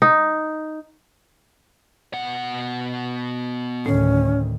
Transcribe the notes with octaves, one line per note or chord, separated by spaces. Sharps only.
D#4
B2 F#5
D2 A2 D#3 C#4